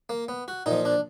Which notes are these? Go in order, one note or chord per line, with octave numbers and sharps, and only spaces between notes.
A#3
B3
F#4
A#2 F3 D#4
D4